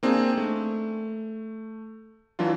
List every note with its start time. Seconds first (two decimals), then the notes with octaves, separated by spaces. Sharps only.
0.03 A#3 C4 D4 D#4 G#4
0.37 A3
2.39 E3 F#3 D4 F4